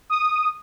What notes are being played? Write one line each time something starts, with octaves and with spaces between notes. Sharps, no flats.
D#6